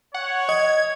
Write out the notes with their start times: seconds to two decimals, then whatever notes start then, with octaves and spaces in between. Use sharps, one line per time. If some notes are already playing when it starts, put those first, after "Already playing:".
0.14 C#5 F#5
0.49 D#5 G#6